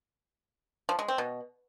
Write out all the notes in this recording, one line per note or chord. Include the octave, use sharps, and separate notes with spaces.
F3
G#3
C4
B2